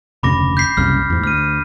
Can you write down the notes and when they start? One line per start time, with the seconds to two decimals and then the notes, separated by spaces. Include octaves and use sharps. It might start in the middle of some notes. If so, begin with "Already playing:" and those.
0.23 F1 D2 C#3 B5 D6 A#6
0.57 G6 B6 C7
0.77 F#1 C2 C#3 F6 C7
1.10 E2 G#2
1.24 D2 F6 D#7